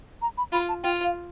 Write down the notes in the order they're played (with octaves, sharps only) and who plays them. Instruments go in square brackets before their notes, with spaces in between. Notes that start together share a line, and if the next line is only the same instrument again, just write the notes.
[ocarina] A#5
B5
[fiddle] F4 [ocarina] B5
[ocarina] A5
[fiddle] F4 [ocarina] G5
[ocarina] F5